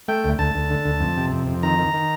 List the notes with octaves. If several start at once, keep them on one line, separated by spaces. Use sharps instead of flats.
A3 G5
D2
D2 A5
D2
D3
D2
F2
C3
F2
F2
D#3 A#5
D#3
D#3